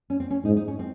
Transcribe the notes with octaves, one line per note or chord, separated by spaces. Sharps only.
C#4
C4
C#4
G#2 D#4
D#4
C#4
C4